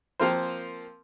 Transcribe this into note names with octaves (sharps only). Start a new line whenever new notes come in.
F3 A#3 C4 F4 A#4 C5